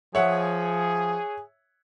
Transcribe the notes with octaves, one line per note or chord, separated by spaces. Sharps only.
F3 G#4 C#5 E5 F#5